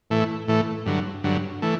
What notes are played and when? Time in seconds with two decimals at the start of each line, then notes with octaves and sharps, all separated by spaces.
0.10 A2 E3 A3
0.48 A2 E3 A3
0.86 G2 D3 F#3
1.24 G2 D3 F#3
1.62 E3 A3